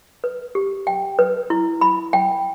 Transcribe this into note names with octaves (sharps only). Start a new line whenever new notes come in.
B4
G4
G5
B4
E4
B5
G5